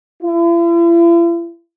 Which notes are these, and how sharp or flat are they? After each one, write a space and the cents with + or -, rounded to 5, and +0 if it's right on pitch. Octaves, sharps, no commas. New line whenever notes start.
E4 +45